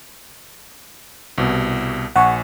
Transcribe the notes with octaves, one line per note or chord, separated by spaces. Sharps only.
C2 B2
A#1 F#5 G#5 C#6